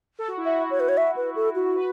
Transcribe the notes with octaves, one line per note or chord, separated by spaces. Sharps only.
A4
F#4
E4
F#4 E5
C#5
B4
C#5
E5
B4
A4
F#4
B4